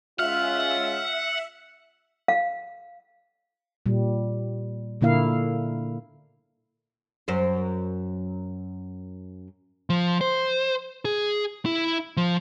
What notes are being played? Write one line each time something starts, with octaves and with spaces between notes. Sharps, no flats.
G#3 C#4 F4 E5 F#5 F6
F5
A#2 G3
A#2 D3 A#3 E4 F5
F#2 C5
F3
C5
G#4
E4
F3